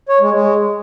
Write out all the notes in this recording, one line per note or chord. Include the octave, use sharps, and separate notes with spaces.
C#5
G#3
G#3